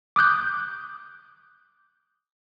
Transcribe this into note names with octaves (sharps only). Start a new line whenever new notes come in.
D6 D#6 F#6 G6